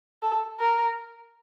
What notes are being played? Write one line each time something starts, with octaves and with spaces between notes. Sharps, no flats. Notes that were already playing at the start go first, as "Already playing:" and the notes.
A4
A#4